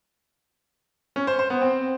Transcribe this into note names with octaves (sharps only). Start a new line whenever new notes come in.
C#4
C5
C5
B3
C4